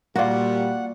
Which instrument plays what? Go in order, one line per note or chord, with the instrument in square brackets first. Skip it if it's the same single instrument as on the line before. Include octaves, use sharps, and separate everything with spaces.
[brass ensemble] A#2 G3 [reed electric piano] A#3 D5 [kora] F4 F#4 [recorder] F#5